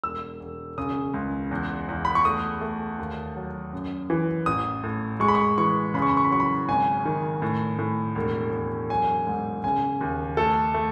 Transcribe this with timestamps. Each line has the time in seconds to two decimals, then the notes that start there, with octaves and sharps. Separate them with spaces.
0.04 E1 E6
0.40 E1
0.78 C#3 D#6
1.14 C#2
1.51 E2
1.89 E2
2.05 B5
2.15 C#6
2.25 A3 D#6
2.61 A3
2.99 D#2
3.36 F#3
3.73 F#2
4.10 E3
4.46 A1 D#6
4.84 A2
5.20 G#3 C#6
5.28 B5
5.35 C#6
5.58 E3 C#6
5.94 C#3 B5
6.02 C#6
6.09 B5
6.17 C#6
6.24 B5
6.31 F#3 C#6
6.40 B5
6.68 G#1 G#5
7.05 D#3
7.42 A2
7.79 A2
8.15 E1
8.53 E1
8.90 F#3 G#5
9.27 G#2
9.64 C#3 G#5
10.01 D#2
10.37 A3 A4
10.74 A3